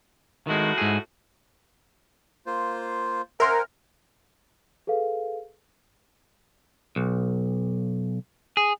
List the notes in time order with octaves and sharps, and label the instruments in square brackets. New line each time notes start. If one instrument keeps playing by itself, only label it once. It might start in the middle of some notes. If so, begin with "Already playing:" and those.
[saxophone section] A2 E4 F#4 [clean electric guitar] D#3 G#3
[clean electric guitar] G#2 G#4
[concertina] A#3 F4 C5
[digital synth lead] A#4 [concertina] C5 F#5 G#5 [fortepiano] E5 C6
[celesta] G#4 A4 B4 F5
[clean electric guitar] B1
G#4